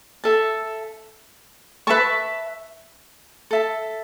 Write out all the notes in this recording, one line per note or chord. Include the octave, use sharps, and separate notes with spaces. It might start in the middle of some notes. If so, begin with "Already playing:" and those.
A4 E5 A5
B4 E5 A5 C#6
A4 E5 A5